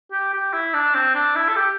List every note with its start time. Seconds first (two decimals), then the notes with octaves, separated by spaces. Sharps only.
0.12 G4
0.33 G4
0.53 E4
0.74 D4
0.94 C4
1.15 D4
1.36 E4
1.48 A4
1.56 G4